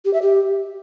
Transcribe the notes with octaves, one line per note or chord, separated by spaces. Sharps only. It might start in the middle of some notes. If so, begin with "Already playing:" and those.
G4
E5
G4